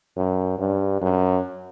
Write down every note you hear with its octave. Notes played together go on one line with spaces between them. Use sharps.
F#2
G2
F#2